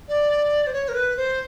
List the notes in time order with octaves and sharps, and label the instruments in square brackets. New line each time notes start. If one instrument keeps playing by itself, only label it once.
[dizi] D5
C5
C#5
A#4
B4
C5